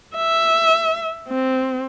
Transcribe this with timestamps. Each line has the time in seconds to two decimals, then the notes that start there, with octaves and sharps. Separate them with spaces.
0.15 E5
1.28 C4